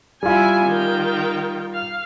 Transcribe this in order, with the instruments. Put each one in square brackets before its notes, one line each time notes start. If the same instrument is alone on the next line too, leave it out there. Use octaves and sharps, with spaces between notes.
[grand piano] G3 F4 [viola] E4 G#5
[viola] D#3 G5
F5